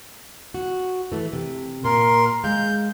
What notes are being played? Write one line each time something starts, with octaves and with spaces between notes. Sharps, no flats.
F#4
E3 A3
C3
A#2 A#4 C6
G#3 F5 G6